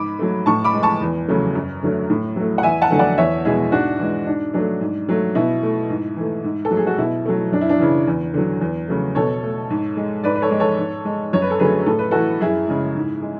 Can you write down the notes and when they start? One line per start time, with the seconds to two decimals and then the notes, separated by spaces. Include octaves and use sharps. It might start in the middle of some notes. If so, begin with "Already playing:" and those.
Already playing: G#2 B5 D6
0.19 F#3 A3
0.46 A2 A5 C#6
0.64 B5 D6
0.74 G#3
0.83 A5 C#6
1.01 E2
1.29 C#3 F#3 A3
1.55 F#2
1.82 D3 F#3 A3
2.10 A2
2.36 F#3 A3
2.58 F#5
2.63 E2 E5 G#5
2.82 F#5 A5
2.90 D3 F#3 A3
2.99 D5 F#5
3.18 E2 C#5 E5
3.45 B2 G#3 E4 G#4
3.72 G#2 D4 F#4
3.99 E3 G#3
4.26 G#2 D4
4.54 F#3 A3 D4
4.81 G#2
5.09 F#3 A3
5.35 B2 E4
5.63 A3
5.90 G#2
6.16 E3 A3
6.44 G#2
6.65 A4
6.71 F#3 A3
6.77 G#4
6.87 F#4
6.98 B2 E4
7.25 F#3 A3
7.52 F#2 D4
7.61 E4
7.69 D4
7.79 C#3 E3
8.07 E2
8.34 D3 F#3
8.61 E2
8.88 C#3 F#3 A3
9.15 B2 A4 C#5
9.43 A3
9.70 G#2
9.97 G#3
10.24 G#2 B4 D5
10.36 B4
10.42 A4 C#5
10.51 G#3
10.60 A4 C#5
10.78 G#2
11.05 G#3
11.33 F#2 C#5
11.42 B4
11.51 A4
11.59 D3 F#3 A3 G#4 B4
11.86 A2 A4
11.99 B4
12.11 E3 A3 F#4 A4
12.41 F#2 E4 G#4
12.68 C#3 G#3
12.96 G#2
13.22 G#3